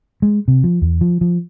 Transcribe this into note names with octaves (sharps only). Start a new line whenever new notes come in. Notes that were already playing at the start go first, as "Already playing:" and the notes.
G#3
C3
F3
E2
F3
F3